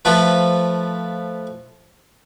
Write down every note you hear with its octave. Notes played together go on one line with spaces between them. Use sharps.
F3 A3 B4